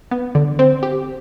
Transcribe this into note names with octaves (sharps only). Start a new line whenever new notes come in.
B3
D3
C4
G4